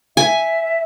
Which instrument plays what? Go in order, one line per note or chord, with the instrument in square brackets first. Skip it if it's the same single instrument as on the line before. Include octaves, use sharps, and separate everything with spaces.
[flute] E5 [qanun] G#5